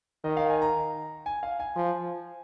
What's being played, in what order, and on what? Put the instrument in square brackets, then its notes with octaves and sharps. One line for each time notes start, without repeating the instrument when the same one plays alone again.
[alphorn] D#3 [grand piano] D#5
[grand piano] F5
G#5
A#5
G#5
F5
G#5
[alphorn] F3